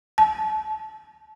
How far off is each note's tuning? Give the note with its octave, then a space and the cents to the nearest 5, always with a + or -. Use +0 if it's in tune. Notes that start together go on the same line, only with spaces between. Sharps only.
A5 -30